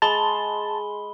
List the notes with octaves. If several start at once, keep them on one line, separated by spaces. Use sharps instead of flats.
G#3 A5 B5 G7